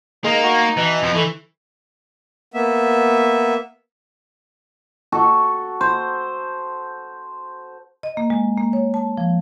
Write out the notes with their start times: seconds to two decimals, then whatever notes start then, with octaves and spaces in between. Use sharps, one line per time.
0.24 G#3 A#3 D#4
0.44 F#4
0.77 B2 E3
1.03 F2 F3
1.14 E3 A3
2.54 A#3 B3 E5
5.12 F#4 A4
5.81 C5
8.03 D#5
8.17 A#3
8.30 G#3
8.58 A#3
8.73 C#5
8.94 A5
9.17 F3